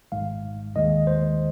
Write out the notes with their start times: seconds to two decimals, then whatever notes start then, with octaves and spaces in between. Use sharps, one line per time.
0.12 G#1 G#2 G#3 F5
0.75 D#2 D#3 G#3 D#5
1.07 C5